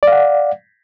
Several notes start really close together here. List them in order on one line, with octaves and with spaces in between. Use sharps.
D5 F5 F#5